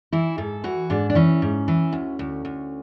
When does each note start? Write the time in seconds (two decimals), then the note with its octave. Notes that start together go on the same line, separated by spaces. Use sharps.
0.12 E3 E4
0.38 G#2 A4
0.64 E3 F#4
0.90 G#2 D4
1.10 D4
1.15 E3 C#4
1.42 G#2
1.68 E3
1.93 D2
2.19 D2
2.45 D2